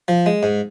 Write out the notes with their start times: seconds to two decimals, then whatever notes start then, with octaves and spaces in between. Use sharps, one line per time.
0.08 F3
0.26 G#3
0.43 G#2